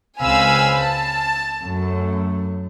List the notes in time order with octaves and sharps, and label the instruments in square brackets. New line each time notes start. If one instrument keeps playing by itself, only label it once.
[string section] C#2 C4 F5 G#5 B5 E6
A5
F#2 A3